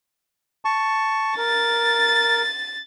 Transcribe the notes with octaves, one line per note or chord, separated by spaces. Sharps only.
A5 C#6
A#4 A6